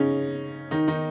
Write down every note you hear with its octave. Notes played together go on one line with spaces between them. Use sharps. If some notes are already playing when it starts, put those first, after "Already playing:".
Already playing: C#3 C#4 D#4
D#3 D#4
D#3 D#4